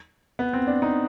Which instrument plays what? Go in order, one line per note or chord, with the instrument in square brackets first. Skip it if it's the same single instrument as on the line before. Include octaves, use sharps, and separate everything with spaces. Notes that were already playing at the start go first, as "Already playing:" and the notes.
[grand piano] B3
C4
D4
D#4